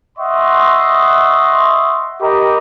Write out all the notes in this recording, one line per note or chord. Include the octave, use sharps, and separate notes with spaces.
D#5 E5 F#5 C6 C#6
G4 A#4 D#5 G5 B5